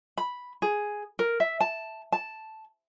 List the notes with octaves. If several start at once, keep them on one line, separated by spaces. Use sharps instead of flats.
B5
G#4
A#4
E5
A5
A5